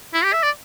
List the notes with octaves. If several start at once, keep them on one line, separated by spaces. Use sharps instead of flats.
E4
G4
E5
D5